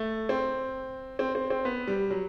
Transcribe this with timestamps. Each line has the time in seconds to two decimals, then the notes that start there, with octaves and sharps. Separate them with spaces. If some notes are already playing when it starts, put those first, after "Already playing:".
Already playing: A3
0.29 C4
1.19 C4
1.35 C4
1.50 C4
1.65 B3
1.87 G3
2.11 F#3